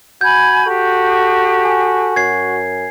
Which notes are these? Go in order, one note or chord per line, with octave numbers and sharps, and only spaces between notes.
F#4 G#5 B5 G6 G#6
F#4 G4 A4
G#5
F#2 G#6 C7